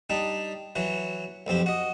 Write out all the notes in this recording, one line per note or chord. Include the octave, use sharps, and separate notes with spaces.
G3 D4 D#4
E3 F#3 F#4
B1 F2 C4 G4
F#4 D#5